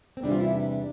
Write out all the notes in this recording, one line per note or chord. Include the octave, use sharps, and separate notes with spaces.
C4
E2 C3 E3 G3 D4
F4
E4
C4
D4